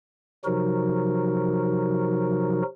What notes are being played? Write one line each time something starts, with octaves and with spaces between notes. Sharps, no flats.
C3 F3 F#3 D#4 F#4 A#4